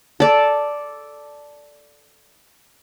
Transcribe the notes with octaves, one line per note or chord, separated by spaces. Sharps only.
A4 D5